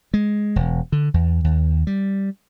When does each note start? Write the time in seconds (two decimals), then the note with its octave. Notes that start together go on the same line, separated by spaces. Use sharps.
0.14 G#3
0.56 E1
0.92 D3
1.14 E2
1.44 D#2
1.87 G3